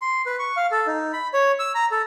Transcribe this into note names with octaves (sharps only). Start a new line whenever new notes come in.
C6
B4
C#6
F5
A4
D#4
B5
C#5
E6
A#5
A4